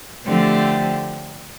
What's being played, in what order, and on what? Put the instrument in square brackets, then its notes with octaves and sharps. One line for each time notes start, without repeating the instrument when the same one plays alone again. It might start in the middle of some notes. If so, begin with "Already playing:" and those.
[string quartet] D3 F3 A3 C4 G4